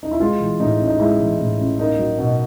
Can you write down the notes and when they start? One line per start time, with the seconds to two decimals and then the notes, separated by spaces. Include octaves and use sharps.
0.03 D#4
0.11 E4
0.20 G#3 F4
0.40 E3
0.60 A2 D#4
0.80 A1
0.88 D#4
1.00 G#3 E4
1.19 E3
1.39 A2
1.59 A1
1.79 A#3 D#4
1.99 F#3
2.18 B2